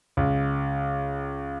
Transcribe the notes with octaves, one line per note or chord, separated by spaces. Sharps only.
C#2